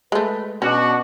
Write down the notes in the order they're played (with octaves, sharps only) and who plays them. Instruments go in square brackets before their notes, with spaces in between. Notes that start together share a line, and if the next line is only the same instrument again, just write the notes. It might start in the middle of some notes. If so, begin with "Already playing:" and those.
[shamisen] G#3 A3 [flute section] B4
[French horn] B2 [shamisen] C#4 [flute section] D4 [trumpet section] F#4